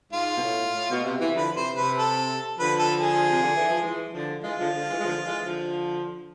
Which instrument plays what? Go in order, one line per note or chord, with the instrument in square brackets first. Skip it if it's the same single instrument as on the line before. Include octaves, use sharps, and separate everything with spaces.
[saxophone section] G#2 [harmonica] F4
[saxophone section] B2
A2
A2
B2
C3
C3 E3
[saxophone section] D3 F3 [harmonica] B4
[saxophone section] C3 E3 [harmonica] C5
[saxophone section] C3 [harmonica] B4
[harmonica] A4
[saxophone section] D3 F3 [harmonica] B4
[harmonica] A4
G#4
[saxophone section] C3
D3
E3
F3
E3 G#3
D3 F3
[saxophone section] E3 G#3 [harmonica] F4
[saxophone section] D3 F3
D3 F3
E3 G#3
G#3
D3 F3
E3 G#3
D3 F3